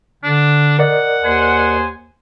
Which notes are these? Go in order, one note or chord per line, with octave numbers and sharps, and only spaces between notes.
D3 D4
A#4 D5 D#5 F#5
D#2 G#4 C5 G#5